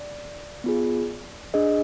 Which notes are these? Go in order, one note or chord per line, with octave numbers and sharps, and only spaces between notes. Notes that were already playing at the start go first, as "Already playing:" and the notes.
Already playing: D5
B3 F4 G#4
D4 G#4 D#5